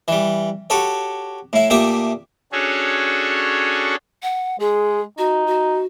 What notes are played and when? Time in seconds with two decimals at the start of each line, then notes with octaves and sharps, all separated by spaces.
0.08 E3 G3
0.70 F#4 G4 A4 C#5
1.53 A2 E4
1.70 A#2 A3 G4 E5 D#6
2.52 C#4 D4 F#4 G#4 A4 C#5
4.23 F#5
4.60 G#3 G#4
5.18 D#4 F#4
5.47 F#4